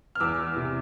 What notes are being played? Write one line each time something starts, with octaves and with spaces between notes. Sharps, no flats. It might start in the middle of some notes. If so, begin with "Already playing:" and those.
F6
E2 D6 E6
E3
C3